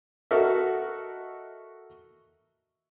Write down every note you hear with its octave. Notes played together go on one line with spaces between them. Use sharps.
F#4 A4 A#4 D#5 E5